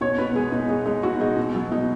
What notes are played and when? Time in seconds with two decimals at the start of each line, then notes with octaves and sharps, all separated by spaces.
0.01 B2 C#5
0.18 B2 B4
0.35 G#3 G#4
0.52 B2 D#4
0.69 G#3 D#4
0.86 G#3 D#4
1.03 B2 F#4
1.20 G#3 D#4
1.37 B2
1.55 F#3
1.71 B2 D#4